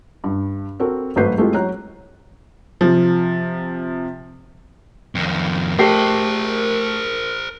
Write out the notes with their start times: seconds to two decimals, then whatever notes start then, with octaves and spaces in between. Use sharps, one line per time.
0.24 G2
0.80 C4 F#4 A4 A#4
1.16 G#1 F#3 A3 B4 G6 C7
1.38 G#3 A3 C4 E4 F4 G4
1.54 F#3 C#5 A#5 F#6
2.81 C3 F3
5.15 F2 D#3
5.79 A3 G4 A#4 C5 C7